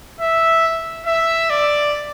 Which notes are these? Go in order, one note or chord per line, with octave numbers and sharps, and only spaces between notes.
E5
E5
D5